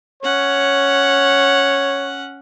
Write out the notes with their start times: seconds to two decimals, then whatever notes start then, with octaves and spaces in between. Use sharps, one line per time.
0.23 C#4 C#5 F#5